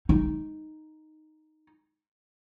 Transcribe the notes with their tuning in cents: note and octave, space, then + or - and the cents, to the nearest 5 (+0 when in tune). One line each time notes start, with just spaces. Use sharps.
D#4 -5